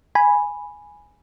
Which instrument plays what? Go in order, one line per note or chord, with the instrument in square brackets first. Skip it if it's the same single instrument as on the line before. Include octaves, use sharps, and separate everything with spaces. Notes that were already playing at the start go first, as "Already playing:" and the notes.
[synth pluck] G#5 B5